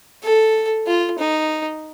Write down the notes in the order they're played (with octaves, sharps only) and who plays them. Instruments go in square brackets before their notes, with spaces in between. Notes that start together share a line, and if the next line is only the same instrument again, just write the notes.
[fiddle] A4
F4
D#4